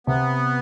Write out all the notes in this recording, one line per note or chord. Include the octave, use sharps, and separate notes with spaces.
C3 B3